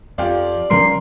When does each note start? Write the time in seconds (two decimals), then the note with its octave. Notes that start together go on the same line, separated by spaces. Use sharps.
0.18 F2 F4 G4 D5
0.70 C#3 F3 G3 A#4 C6